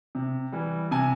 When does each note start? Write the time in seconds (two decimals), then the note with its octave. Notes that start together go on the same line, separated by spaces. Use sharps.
0.15 C3
0.52 E3 G3
0.91 C3 G#5